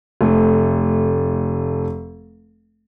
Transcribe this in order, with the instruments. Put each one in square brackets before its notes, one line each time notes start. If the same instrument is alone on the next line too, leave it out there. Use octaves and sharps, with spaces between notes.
[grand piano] F1 A3